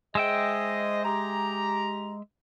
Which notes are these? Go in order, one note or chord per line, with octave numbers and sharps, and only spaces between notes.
G#3 G#4 C5 D#5 E5 G5
G4 A#5